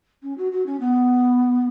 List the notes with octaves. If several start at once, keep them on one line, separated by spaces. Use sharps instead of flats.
C#4
F#4
F#4
C#4
B3